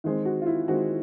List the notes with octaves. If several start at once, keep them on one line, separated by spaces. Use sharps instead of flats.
D#3 G#3 C4
F#4
F4
E4
D#3 G#3 C4 F#4